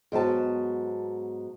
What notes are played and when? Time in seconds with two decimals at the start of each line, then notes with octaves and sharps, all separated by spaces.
0.12 G#2 F#3 B3 A5